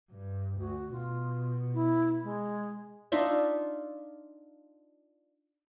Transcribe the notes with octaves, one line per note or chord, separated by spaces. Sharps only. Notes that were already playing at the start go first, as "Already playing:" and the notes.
G2
D2 F#4
B2 F4
E4
G#3
D4 D#4 F4 E5